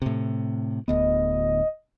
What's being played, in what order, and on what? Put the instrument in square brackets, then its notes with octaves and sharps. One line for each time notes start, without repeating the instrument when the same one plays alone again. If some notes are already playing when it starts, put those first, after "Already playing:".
[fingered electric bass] A2 C3
[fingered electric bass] D1 D2 B3 [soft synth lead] D#5